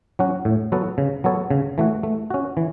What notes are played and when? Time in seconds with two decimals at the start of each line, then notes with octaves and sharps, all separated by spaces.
0.19 F#3 C#4 F#4
0.45 A2
0.72 F#3 B3 F#4 A4
0.98 C#3
1.24 F#3 B3 A4 C#5
1.50 C#3
1.78 E3 A3 F#4
2.03 A3
2.30 C#4 F#4
2.57 E3